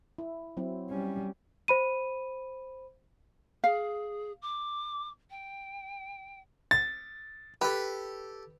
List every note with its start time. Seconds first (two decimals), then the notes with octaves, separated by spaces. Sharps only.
0.18 E4
0.57 F#3 C4 E4
0.90 G3 C#4
1.68 C5 B5 D#7
3.64 G#4 F5
4.42 D6
5.30 G5
6.71 A6
7.61 G4 A4 B4